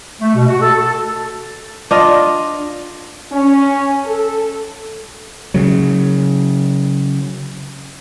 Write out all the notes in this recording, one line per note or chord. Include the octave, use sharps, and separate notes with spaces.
A3
B2
F#4
A4
A4
D4 F4 D#5
C#4
A4
C#3 F#3